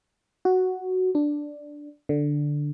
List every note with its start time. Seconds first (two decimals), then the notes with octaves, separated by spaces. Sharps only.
0.45 F#4
1.15 D4
2.09 D3